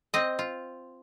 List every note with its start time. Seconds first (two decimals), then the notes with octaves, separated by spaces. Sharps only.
0.14 C4 D#5
0.39 F4